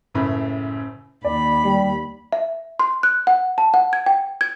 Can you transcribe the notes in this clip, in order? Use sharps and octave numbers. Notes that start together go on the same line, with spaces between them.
F#1 A2 C#3 B5
D#2 D5 B5
G3
E5
C6
F#6
F#5
A5
F#5
G#6
G5
G#6